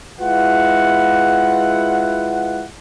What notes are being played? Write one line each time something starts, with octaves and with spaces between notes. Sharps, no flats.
G#3 E4 F4 B4 F#5